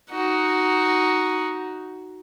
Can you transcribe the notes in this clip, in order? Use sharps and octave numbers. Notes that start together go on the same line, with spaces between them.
D#4 F#4